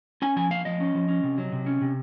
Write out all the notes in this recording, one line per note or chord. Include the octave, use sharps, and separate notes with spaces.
C#4 G#5
F3 G#5
A#3 F5
F3 D#5
C#4
F3
C#4
C3
F#3
C3
C#4
C3